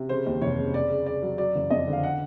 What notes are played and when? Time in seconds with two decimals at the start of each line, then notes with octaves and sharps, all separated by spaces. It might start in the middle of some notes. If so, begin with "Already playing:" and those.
Already playing: C3
0.09 C#3 C5
0.26 D#2
0.41 F1 C#5
0.58 C#3
0.74 C#3 D5
0.90 C#3
1.06 C#3 D5
1.23 F#3
1.38 F#3 D5
1.56 F#1
1.71 F2 D#5
1.87 D3
1.93 F5
2.03 F#5